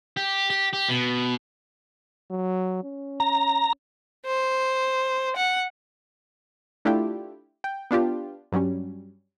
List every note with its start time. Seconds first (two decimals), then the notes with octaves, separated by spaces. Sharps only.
0.17 G4
0.50 G4
0.73 G4
0.89 B2
2.31 F#3
2.84 C#4
3.20 A#5
4.26 C5
5.36 F#5
6.85 A3 D4 E4 F4 G4
7.64 G5
7.91 B3 D4 F4 G4
8.52 G2 F#3 G3 C#4